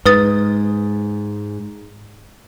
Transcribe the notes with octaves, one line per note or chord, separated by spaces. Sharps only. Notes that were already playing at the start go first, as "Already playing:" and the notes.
G#2 G#3 B4 D#6 A6